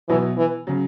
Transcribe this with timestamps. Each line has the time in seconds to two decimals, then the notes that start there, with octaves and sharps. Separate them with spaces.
0.09 B2 E3 F#3 B3 E4
0.37 E3
0.67 C#3 F#3